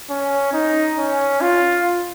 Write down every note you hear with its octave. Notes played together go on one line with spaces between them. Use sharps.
C#4
D#4
C#4
F4